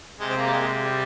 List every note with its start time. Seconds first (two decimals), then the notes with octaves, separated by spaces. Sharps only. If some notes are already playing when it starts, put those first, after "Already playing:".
0.20 C3 G#3
0.30 C4
0.37 A#3
0.47 G3
0.53 G#3
0.85 G3